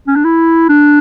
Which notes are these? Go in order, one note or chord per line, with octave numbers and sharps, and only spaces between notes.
C#4
D4
E4
D4